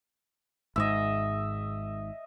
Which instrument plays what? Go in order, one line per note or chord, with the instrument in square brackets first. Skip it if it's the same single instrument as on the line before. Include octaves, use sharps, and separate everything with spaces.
[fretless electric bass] G#1 G#2 [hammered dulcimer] D#5 E5